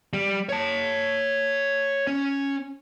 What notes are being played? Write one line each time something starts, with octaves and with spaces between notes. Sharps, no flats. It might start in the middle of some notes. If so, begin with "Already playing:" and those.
G3
C#5 A5
C#4